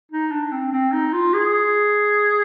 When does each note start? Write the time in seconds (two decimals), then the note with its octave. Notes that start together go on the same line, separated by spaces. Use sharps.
0.12 D#4
0.32 D4
0.52 C4
0.73 C4
0.93 D#4
1.13 F4
1.34 G#4